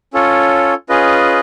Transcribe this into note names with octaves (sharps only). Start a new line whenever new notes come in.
C#4 F4 A4 C#5
C#4 F4 G#4 B4 D#5